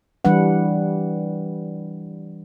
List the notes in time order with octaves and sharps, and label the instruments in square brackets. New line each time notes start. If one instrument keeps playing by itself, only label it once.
[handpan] E3 G3 D4 B4 F#5